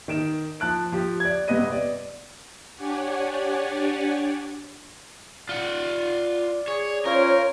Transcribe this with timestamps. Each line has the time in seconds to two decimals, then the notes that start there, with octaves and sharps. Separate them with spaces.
0.08 D#3 D7 E7
0.60 F3 A5 F#6 D7
0.92 F3 G4
1.20 D5 G#6
1.48 G2 C3 B3 B4 D#5 D#7
1.72 D5
2.76 D4 G4 C#5 D5 F#5 G#5
5.49 F4 D5 F#5
6.68 G#4 C#5
7.05 C#4 F4 A#4 C5 C#5